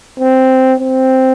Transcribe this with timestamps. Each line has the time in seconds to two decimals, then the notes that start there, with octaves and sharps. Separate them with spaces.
0.20 C4
0.80 C4